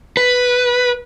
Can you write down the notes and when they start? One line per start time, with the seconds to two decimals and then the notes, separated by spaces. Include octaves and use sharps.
0.17 B4